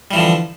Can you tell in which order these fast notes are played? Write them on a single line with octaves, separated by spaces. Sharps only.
G3 E3 F3 D3